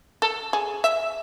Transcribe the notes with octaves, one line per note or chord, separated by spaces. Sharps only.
A4
G#4
E5